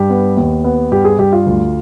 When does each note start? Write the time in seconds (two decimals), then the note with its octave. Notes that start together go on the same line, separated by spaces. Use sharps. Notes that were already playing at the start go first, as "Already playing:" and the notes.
Already playing: G2 G4
0.10 B3
0.37 D#2
0.64 B3
0.92 G2 G4
1.05 G#4
1.19 G2 G4
1.32 F4
1.46 D2